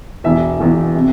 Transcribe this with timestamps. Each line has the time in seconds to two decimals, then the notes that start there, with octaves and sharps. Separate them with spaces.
0.24 E1 E2 E3 E5
0.60 E1 E2 E3
0.96 C3